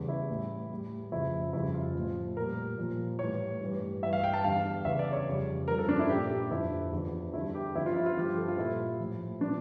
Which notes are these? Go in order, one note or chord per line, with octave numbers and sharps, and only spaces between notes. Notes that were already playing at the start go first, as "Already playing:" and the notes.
Already playing: E2 C#3 G3
E4
A2 G3
A2 G3
F2 C#3 F3 E4
F2 C#3 G3 E4
F4
A2 F3
A#2 G3 A#4
A#2 F3
A2 E3 G3 C#5
G2 E3 G3
G2 E3 G3 E5
F5
G5
A5
E2 D3 G3 F5
E2 C#3 E3 E5
D5
C#5
F2 C#3 G3
G2 F3 A#4
A4
D4
E4
A#2 G3 G4
G4
F2 D3 F3 E4
E2 D3 F3
E2 D3 G3 E4
G4
E2 D3 F3 E4
F4
E4
F4
G2 F3 G4
G4
A4
F4
A#2 G3 E4
A2 F3
A#2 F3 D4